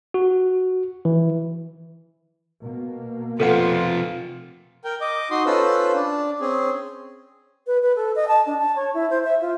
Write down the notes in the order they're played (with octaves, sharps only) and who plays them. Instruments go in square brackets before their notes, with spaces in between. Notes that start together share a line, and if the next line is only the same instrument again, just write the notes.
[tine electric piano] F#4
E3
[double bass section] B2 A#3
[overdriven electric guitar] C3 F3 [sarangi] F4 [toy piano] A4 B4 F#5
[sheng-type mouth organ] A#4 G5
D#5 D6
D#4 F#4 C6 D#6
C#4 F4 A4 B4 C5 E6
D4
C4 C#4 G#4
[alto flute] B4
B4
A4
D#5
A5
D4
A5
C#5
E4
C5
E5
F4